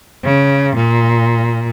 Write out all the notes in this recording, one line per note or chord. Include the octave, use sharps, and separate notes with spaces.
C#3
A#2